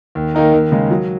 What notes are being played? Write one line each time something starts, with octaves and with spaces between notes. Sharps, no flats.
D#2
D#3 A#3 D#4 A#4
D#2
C#3 G#3 D#4
F#3